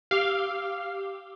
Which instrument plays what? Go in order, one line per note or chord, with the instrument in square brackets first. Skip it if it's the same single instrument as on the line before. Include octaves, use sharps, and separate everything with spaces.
[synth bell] G4 D6 E6 [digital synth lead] F5